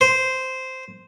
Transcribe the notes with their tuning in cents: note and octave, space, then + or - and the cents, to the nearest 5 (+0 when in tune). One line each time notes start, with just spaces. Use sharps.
C5 -10